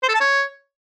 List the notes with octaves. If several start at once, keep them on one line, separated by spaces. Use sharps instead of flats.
C5
A4
A5
C#5